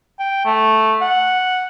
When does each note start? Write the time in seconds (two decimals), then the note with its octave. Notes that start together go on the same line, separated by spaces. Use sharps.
0.19 G5
0.45 A3
1.01 F#5